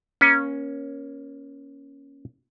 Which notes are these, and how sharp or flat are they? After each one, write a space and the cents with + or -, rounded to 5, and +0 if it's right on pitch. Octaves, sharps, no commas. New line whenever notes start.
A#3 +25 C#4 +0